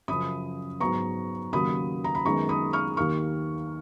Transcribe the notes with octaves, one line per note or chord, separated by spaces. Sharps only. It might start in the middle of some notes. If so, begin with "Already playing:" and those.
F#2 C#3 F3 B5 D#6
G#2 F#3 B3 A#5 C#6
D#2 C#3 F#3 A#3 B5 D#6
A#5
B5
F#2 D#3 G#3 B3 A#5 C#6
B5 D#6
C#6 F6
D#2 D#3 A#3 C#6 F6